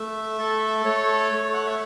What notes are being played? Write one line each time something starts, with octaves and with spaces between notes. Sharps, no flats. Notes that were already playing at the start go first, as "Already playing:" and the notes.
Already playing: A3 E5
A4
A3 C#5
A3
F#5
E5